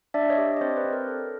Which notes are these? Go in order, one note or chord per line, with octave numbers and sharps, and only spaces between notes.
D4 D5 E5
C#5 D#5
G4
D#5
C4 C5 D5
B4
C4
A#4
A4